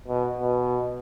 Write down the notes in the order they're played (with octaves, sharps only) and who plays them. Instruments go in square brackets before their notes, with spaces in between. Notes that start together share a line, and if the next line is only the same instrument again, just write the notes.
[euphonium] B2
B2